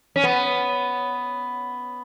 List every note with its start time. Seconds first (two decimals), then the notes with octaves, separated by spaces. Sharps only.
0.16 C#4
0.24 B3